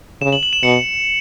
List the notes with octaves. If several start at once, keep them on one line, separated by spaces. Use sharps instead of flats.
C#3 E7
F#7
F#7
E7
B2 C#7